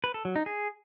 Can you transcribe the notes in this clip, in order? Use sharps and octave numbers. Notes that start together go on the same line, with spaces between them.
B4
A4
F#3
D#4
G#4